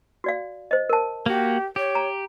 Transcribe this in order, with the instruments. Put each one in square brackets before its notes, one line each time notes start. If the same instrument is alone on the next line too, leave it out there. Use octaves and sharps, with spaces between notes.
[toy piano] F#4 D5 F5
C5 D#5
A#4 A5
[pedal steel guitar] A#3 F#4 [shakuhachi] G4
[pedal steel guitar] G4 [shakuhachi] C#5
[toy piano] A#5